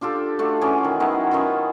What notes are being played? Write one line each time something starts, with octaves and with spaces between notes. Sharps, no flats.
D4 F4 G4 A4
A3 D4 F4 F#4
E3 C#4 G#4 D5
D#3
D#3 F#3 B3 E4
D#3 C#4 E4 F4